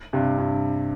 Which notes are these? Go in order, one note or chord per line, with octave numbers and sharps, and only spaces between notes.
G2 C3
G2